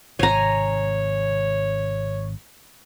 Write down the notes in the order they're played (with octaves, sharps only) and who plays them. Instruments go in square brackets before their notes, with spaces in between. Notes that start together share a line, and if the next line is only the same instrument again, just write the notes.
[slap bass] G#1 G#2 C3 [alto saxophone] C#5 [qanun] G#5 A#5